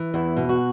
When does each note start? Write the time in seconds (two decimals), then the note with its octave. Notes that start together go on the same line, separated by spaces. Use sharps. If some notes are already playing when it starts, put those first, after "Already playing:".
Already playing: E3
0.14 E2 E4
0.36 B2
0.49 F#4